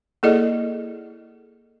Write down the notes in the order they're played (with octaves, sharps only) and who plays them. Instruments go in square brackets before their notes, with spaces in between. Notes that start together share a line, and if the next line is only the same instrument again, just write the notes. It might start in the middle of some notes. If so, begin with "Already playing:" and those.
[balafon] A#3 E4 G#4 A4 D5 D#5